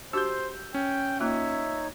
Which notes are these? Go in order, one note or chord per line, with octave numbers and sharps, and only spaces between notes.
D4 F#4 G4 C5 E6 G6
C#4 G5
A#3 D#4 F4 C#5 E5